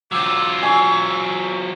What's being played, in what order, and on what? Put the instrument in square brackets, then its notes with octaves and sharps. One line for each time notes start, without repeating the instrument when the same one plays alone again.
[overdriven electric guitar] F#3 F4 [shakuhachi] D6 [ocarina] E6
[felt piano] G#5 [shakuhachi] C#6